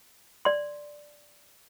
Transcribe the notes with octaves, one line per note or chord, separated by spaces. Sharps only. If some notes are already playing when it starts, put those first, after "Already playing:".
D5 C6